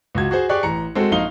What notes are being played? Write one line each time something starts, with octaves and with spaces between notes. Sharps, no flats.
C#2 F#4 G#6
F#4 G#4 C5
G4 G#4 D5 C#6 F#6
A1 A#5 C#7
G#3 C4 F#4 A4
A#1 D#4 F5 G7